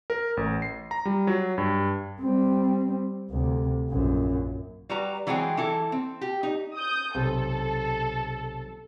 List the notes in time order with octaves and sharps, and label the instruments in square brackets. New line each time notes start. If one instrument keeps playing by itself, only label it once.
[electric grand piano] A#4
A1
C7
A#5
G3
F#3
G2
[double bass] G3 C4
D2 C3
A#1 F#2
[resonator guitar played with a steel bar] G3 F#4 B4 A#5
E3 F#3 G#3 C4 G#4 G5
E3 E4 A4
C4
G4
D#4
[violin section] D#6 G6
[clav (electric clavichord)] B1 C3 [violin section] A4